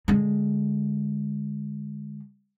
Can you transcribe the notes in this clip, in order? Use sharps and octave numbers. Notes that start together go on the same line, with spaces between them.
D3 G#3